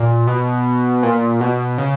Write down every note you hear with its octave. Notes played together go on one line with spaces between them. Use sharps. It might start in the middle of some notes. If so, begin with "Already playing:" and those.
Already playing: A#2
B2
A#2
B2
C#3